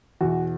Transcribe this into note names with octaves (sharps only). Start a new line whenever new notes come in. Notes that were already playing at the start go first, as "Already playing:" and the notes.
E2 B2 F#4